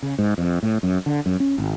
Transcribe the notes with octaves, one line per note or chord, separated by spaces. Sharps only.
C#3
G#2
F2
A2
F#2
D3
F#2
C#4
G#1